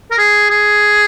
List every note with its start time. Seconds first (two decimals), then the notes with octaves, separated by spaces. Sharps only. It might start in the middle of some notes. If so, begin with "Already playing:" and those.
0.11 A#4
0.19 G#4
0.51 G#4